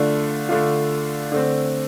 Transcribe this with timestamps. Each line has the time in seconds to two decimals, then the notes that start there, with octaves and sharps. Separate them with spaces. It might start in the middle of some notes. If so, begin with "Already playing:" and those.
Already playing: D3 A3 D4 F4
0.49 D3 A3 D4 F4
1.32 D3 A3 C4